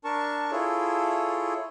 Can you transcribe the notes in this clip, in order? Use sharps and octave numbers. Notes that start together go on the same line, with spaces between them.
D4 A#4 A5 C#6
E4 F4 G#4 A4 C#5